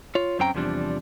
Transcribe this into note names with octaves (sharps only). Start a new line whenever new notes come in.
F4 C#5
F#2 C4 C#4 G5 A#5
E2 C3 F3 G3 C#4 D4